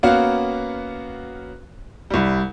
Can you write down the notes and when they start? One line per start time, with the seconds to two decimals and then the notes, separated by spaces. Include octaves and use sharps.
0.03 A#3 B3 C#4 F#4 F5
2.11 C2 G3